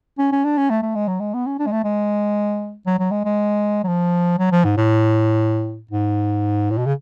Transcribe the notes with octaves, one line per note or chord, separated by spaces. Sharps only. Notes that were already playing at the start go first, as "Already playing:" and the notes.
C#4
C#4
D4
C#4
A3
A3
G#3
F#3
G#3
B3
C#4
D4
G#3
A3
G#3
F#3
F#3
G#3
G#3
F#3
F3
F#3
F3
G#2
A2
G#2
A2
B2
C#3